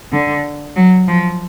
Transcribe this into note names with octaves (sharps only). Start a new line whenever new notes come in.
D3
F#3
F3